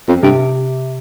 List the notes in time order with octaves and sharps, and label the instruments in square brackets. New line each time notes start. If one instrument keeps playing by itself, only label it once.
[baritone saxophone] F2
[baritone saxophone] G2 [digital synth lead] C3